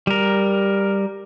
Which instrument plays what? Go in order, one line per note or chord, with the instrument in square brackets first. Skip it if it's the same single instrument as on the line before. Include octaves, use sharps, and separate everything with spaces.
[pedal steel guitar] G3 A#4